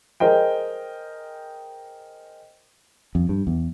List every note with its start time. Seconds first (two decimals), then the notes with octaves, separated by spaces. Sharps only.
0.20 G#4 A#4 C5 D#5 G5
3.15 F2
3.29 G2
3.47 E2